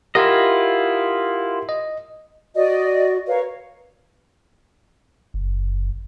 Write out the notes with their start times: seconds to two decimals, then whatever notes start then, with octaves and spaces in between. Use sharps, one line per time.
0.15 E4 F4 G4 A#4 D#5 F#5
1.69 D#5
2.56 F#4 D5 D#5
3.27 A#4 B4 C#5 F5
5.34 F#1